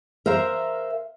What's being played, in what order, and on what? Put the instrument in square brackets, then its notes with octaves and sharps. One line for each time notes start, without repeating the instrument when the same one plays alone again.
[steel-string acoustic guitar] A#4 C5 E5 F5 A#5